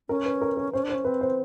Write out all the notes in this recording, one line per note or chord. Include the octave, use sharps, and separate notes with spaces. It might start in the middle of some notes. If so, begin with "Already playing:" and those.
C#4 A#4
B4
A#4
A#4
C#4 C5
D4
C5
C#4
C4 B4
C5